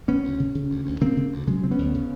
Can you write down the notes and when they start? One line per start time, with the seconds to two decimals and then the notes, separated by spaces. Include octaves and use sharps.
0.08 C#3 B3 C#4
0.24 D2
0.40 C#3
0.55 C#3
0.70 D2
0.86 D2
1.01 C#3 A#3 C4
1.17 C#3
1.32 D2
1.47 C#3 F#3 G#3
1.63 C#3 C4
1.71 B3 C#4
1.79 D2
1.94 C#3